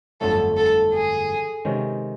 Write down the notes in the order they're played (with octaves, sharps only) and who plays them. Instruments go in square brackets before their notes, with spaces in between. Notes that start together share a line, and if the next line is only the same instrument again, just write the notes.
[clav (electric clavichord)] G1 F2 D3 F#3 A3 [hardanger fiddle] A4
[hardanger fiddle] A4
G#4
[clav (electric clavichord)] C3 D#3 G#3 C#4